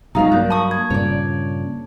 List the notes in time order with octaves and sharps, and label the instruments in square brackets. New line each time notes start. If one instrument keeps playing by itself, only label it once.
[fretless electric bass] B1 F#3 G#3 [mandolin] D#4 F4 C#5 [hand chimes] F5 A#5
[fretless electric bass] G2 F#3 A#3 [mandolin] D4 G6
[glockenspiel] A5 [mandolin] B5 C#6 D#6
[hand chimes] G#6
[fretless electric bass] G2 A#2 C#3 [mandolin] C#5 D5